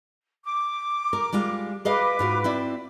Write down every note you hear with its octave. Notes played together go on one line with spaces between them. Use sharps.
D6
A#4
G3 G#3 F4
G#4 B4 D#5 F5 D6
G#2 F4 F#4
C4 E4 D5